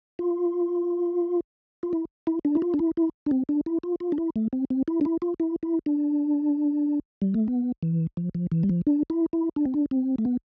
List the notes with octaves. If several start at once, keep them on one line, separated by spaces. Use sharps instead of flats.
F4
F4
E4
E4
D4
E4
F4
D4
E4
E4
D4
C4
D4
E4
F4
F4
D4
E4
A3
C4
C4
E4
D4
E4
F4
E4
E4
D4
G3
A3
B3
E3
F3
F3
E3
G3
F3
D4
E4
E4
D4
C4
D4
C4
A3
B3